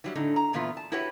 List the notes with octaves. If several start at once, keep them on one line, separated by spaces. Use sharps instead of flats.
E3 F#3 G3
A2 D3 D#4
A#5
E2 A#2 E3 B3 F4
A5
E4 F#4 G4 B4 C#5 F#5